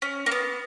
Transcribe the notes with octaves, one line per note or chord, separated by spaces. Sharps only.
C#4
A#3
B3